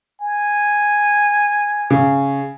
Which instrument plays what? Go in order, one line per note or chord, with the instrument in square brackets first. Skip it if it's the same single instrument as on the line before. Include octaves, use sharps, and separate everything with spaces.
[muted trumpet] G#5
[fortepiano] C#3